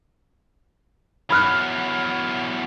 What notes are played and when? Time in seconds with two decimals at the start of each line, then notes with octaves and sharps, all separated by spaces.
1.30 E2 F#3 B5 F6 F#6